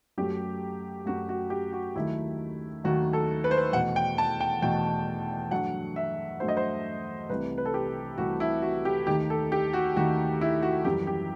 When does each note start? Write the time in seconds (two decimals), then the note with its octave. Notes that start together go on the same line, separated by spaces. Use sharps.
0.18 F#2 F#3 A3 G4
1.06 F#2 F#3 A3 F#4
1.29 F#4
1.50 G4
1.72 F#4
1.95 D#2 D#3 F#3 A3 E4
2.84 D#2 D#3 F#3 A3 F#4
3.13 A4
3.44 B4
3.51 C5
3.58 B4
3.73 E2 B2 A3 F#5
3.96 G5
4.18 A5
4.40 G5
4.62 E2 B2 A3 G5
5.51 G2 F#3 A3 F#5
5.96 E5
6.40 G2 F#3 A3 C5
6.48 D#5
6.57 C5
7.29 C2 C3 E3 A3 B4
7.58 B4
7.65 A4
7.74 G4
8.18 C2 C3 E3 A3 F#4
8.40 E4
8.62 F#4
8.85 G4
9.07 D#2 D#3 A3 G4
9.30 A4
9.52 G4
9.73 F#4
9.96 D#2 D#3 A3 F#4
10.41 E4
10.62 F#4
10.85 F#2 E3 G3 G4
11.07 G4